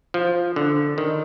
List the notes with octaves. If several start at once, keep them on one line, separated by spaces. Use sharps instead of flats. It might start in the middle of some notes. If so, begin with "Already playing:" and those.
F3
D3
D#3